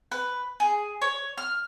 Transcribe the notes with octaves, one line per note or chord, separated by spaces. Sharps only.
B4
G#4
C#5
F6